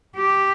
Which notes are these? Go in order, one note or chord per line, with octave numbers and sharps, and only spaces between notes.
G4